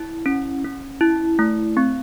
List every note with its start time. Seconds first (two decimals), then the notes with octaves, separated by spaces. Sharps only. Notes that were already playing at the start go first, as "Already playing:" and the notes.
Already playing: E4
0.26 C#4
0.64 C#4
1.01 E4
1.39 A3
1.77 C4